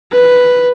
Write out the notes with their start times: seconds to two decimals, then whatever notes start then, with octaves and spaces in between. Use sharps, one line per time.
0.12 B4